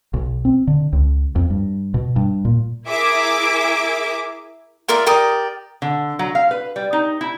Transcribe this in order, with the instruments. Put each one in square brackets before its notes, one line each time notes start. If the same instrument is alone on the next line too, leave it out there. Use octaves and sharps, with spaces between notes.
[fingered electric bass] B1
C4
D3
C#2
F2
G2
B2
G2
A#2
[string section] E4 G#4 A#4 E5 D6
[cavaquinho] F4 A#4 D5 E5
G4 A#4 D5 D#6
[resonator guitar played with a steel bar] D3
F#3
F5
B4
G3
D#4
E4